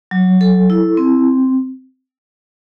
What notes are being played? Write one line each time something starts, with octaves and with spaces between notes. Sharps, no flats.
F#3
A4
E4
C4